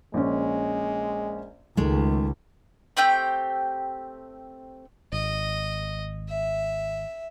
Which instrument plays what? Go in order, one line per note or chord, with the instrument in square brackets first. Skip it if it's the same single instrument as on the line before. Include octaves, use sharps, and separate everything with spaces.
[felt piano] A#1 C#4 [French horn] G#3
[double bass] C#2 [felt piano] D#3 [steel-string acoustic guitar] G#3 A3
[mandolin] A3 C4 G4 G5
[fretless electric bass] G#1 [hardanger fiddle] D#5
[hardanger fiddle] E5